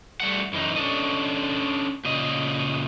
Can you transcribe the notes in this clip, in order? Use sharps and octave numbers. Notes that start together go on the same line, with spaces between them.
G3 A3 F#5
F#2 E3 D#4
C#4 D4 A4 D#5
A#2 C#3 D#5